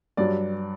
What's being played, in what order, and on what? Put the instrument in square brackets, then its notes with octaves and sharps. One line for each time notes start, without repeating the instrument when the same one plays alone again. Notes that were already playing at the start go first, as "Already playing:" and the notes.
[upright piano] G2 F#3 D5